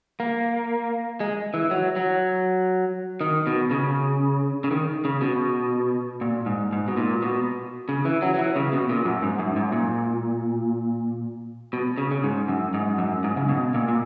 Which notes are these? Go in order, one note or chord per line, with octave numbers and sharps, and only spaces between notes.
A#3
G#3
E3
F#3
F#3
D#3
B2
C#3
C#3
D#3
C#3
B2
A#2
G#2
G#2
B2
A#2
B2
C#3
E3
F#3
F#3
E3
C#3
B2
A#2
F#2
G#2
F#2
G#2
A#2
B2
C#3
C#3
G#2
F#2
G#2
F#2
G#2
C#3
B2
A#2
A#2